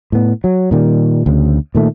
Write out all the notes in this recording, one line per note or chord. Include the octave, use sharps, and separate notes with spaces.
A2 B3
F#3
A#2 D#3 G3
D2 C#3
A#2 D#3 A3